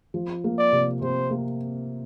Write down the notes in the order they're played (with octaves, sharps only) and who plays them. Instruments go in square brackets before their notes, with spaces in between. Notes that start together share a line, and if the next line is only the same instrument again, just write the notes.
[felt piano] F3
A#3
[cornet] D5
[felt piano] C3
[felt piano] C3 [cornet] C5
[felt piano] A#3